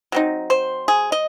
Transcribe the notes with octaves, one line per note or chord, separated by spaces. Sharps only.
F#3 C4 D#4
C5
G#4
D#5